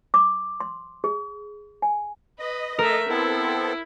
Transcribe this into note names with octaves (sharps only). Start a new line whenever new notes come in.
D6
C6
G#4
G#5
B4 D#5
A3 A#4 E5
B3 C4 E4 A4